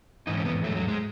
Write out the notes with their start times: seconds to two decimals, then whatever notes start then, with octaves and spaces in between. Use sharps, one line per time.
0.27 G#2 E3 D#4
0.37 C#4
0.45 B3
0.64 G#2 F#3 A3
0.75 F#3
0.88 G#3